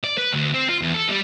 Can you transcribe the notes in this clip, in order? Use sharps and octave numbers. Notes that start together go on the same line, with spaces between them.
D5
B4
D2
C4
F4
E2
A4
G3